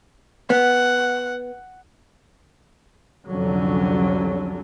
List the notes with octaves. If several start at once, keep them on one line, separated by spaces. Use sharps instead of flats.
B3 F#5
C2 F2 D3 F#3 C#4